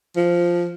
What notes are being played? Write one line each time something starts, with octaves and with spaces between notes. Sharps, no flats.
F3